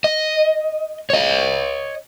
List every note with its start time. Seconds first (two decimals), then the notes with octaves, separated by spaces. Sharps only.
0.04 D#5
1.10 C#5 D#5